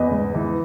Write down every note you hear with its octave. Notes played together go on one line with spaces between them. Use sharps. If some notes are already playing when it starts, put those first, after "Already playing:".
Already playing: E2 B4 D#5
G#2
E3